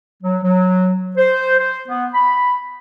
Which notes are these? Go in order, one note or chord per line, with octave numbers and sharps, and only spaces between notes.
F#3
F#3
C5
C5
B3
B5